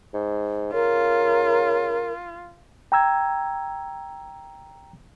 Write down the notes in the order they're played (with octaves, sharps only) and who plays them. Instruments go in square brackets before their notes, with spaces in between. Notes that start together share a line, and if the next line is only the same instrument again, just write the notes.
[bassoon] G#2
[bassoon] C#3 [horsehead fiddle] F4 [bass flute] A#4
[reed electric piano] G5 A#5 E6 G#6